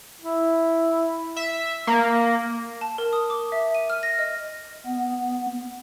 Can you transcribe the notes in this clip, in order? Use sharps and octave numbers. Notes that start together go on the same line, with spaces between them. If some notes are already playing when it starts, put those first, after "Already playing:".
E4
E5
A#3
A5
A#4
D#6
D6
E5
D#7
F6
A#6
D#5
B3